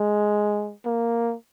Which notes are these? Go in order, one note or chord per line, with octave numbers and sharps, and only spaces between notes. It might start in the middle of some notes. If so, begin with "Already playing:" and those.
Already playing: G#3
A#3